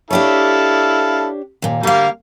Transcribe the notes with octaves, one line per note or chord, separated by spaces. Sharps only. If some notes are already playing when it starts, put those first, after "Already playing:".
D4 E4 G4 A4 C#5 F5
D#2 A#2
D2 G3 A#3 F5